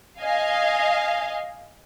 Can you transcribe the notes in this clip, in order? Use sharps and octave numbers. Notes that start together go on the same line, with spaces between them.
D#5 F5 G#5